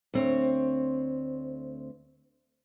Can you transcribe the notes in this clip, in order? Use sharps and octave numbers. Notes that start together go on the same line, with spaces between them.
D2 C4 C#5